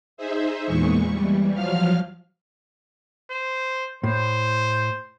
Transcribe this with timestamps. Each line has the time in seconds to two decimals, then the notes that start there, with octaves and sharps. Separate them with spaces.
0.17 D#4 G#4 C5 E5
0.66 E2 A#2 E3 G#3 C#6
1.12 E3 G3
1.54 F3 F#3 F5 F6
3.31 C5
4.03 A2 C5